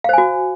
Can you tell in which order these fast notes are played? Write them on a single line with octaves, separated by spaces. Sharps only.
F5 C5 G#5 F#4